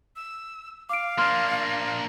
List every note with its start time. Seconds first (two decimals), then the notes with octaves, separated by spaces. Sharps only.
0.16 E6
0.89 F5 D6 D7
1.18 A#3 D4 C6 F6